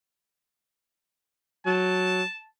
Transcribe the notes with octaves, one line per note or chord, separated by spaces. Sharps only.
F#3 A5